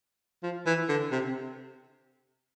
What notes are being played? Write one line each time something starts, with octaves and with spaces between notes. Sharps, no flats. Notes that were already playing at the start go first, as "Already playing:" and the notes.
F3
E3
D3
C3